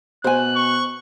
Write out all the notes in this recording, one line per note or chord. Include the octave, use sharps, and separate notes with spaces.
B2 C5 G#5 F#6
C#6